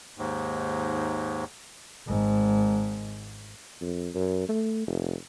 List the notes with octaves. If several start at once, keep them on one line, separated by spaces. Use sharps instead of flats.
D#2 G#2
G#1 G#2
F2
F#2
A3
F1